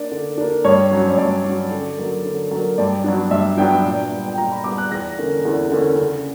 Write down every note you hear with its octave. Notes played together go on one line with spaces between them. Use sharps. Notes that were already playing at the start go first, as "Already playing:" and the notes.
Already playing: A#3 D4 D5
D3
A#3 D4
G2 C#5
F#3 C#4
C#5
G2 D5
F#3 C#4
D3
F#3 A#3
D3
F#3 A#3
G2 D5
F#3 B3 D4
G2 E5
F#3 B3 D4 G5
A#2
G3 B3
G5
A#2 A#5
B5
G3 B3 D6
F#6
E2 A#6
D3 A#3 C#4
E2
D3 A#3 C#4
C#3